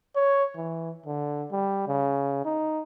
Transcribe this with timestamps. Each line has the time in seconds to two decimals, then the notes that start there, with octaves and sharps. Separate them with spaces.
0.16 C#5
0.56 E3
1.06 D3
1.51 G3
1.87 C#3
2.45 D#4